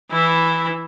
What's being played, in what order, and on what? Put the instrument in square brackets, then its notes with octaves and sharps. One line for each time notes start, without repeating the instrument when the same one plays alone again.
[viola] E3 E4